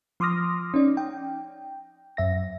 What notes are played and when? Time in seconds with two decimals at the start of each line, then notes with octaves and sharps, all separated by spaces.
0.20 F3 C6 D6 D#6 F6 A#6
0.74 C#4 D#4 D5
0.97 G5
2.17 F#2 E5 A#6